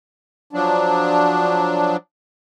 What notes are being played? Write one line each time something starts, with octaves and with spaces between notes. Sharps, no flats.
F3 F#3 D4